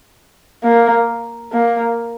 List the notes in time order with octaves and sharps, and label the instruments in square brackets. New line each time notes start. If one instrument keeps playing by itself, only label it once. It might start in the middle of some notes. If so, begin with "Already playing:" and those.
[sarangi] A#3
A#3